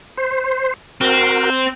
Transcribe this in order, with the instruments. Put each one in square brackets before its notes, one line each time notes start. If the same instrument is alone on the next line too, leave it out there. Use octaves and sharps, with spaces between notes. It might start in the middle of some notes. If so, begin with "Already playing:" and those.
[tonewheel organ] C5
[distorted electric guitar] C4 [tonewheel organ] F#4 A#4